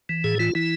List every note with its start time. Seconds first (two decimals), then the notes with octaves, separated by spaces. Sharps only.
0.09 E3
0.24 A2 G#4
0.39 E3 F4
0.55 E3 E4